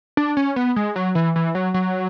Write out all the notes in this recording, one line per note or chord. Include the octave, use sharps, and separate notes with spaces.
D4
C#4
B3
G#3
F#3
E3
E3
F#3
F#3